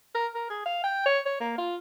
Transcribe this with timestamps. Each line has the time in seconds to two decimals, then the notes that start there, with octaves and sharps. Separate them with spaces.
0.15 A#4
0.35 A#4
0.50 G#4
0.66 F5
0.84 G5
1.06 C#5
1.26 C#5
1.41 A#3
1.58 F4